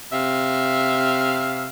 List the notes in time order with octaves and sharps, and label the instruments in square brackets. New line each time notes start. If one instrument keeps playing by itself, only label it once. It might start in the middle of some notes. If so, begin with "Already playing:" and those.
[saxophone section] C3 E5 F5